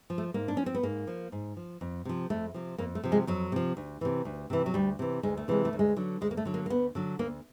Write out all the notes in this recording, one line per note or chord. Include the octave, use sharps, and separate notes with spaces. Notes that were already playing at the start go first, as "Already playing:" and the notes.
F3
A3
G#2 A#3
D4
F3 C#4
C4
B3
G#2 A#3
F3
G#2
F3
F2
C3 F3
F2 A3
C3 F3
F2 A#3
A3
C3 F3
G#3
F2 F#3
C3 F3
D2
C3 E3
D2
C3 E3
F#3
D2 G3
C3 E3
D2 G#3
A3
C3 E3 G#3
A3
D2
G#3
D3 F#3
D2 G#3
A#3
A3
D3 F#3
A#3
A#3
D2 B3
D3 F#3
D2 A#3